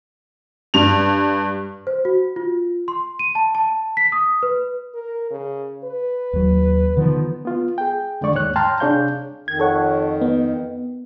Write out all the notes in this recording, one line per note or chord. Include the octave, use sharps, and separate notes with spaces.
G2 F7
C5
F#4
F4
C6
D#7
A5
A5
B6
D#6
B4
A#4
C#3
B4
D#2 F#3
D3 D#3 F3 B3
B3 F4
G#4 G5
F2 D3 G#3 D5 C#6
D#2 G#2 C#5 F#6
G5 A5 A#5 C6 F6
C3 D4 G#4 C#5 F5 G6
F2 D#3 G#6
A4 C#5 F#5
B3